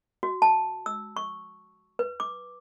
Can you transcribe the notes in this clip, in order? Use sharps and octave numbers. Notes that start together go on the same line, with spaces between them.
F#4
A5
E6
C#6
B4
D6